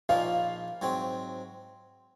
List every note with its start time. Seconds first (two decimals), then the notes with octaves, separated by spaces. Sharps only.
0.09 A#1 A#2 F3 A#3 D#4 F5
0.82 G#2 F#3 C4